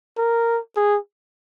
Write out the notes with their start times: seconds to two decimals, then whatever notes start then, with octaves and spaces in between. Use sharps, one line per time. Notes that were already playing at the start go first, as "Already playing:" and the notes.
0.18 A#4
0.77 G#4